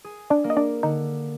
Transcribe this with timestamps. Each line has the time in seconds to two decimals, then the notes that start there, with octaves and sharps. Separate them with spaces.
0.04 G#4
0.30 D4 D5
0.44 A#3
0.50 D#5
0.57 D4 D5
0.83 D3 D#4